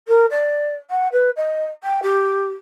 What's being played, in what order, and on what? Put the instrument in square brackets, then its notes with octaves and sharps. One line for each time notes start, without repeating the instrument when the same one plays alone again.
[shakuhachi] A#4
D5
F#5
B4
D#5
G5
G4